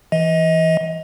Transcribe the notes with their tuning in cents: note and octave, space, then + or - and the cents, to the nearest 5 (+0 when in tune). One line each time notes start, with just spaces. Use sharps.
E3 +10 D#5 +30